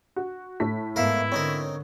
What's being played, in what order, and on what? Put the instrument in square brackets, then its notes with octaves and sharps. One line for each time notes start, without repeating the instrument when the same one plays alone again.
[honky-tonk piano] F#4
A2 A3 B6
[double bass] G#2 B3 [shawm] E4 [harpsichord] A#4 E5 F5
[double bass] D3 [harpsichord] C4 D#4 A#4 [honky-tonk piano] C#5